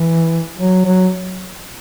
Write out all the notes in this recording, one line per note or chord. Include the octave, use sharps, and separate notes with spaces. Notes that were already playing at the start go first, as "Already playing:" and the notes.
Already playing: E3
F#3
F#3